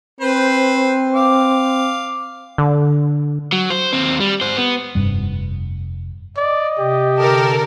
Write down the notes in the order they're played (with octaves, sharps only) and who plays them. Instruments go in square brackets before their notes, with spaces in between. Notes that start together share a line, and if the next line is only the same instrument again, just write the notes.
[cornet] C4 [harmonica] B4 C5 B5
[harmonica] F5 D6
[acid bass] D3
[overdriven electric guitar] F#3
C5
D#2 C4
G3
G#2 C5
B3
[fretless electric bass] F1 G2 G3
[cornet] D5 [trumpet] D#5
[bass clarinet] C3 [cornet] G4
[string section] D3 A4 A#4